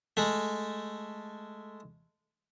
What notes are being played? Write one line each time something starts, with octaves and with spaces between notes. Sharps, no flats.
G#3 A3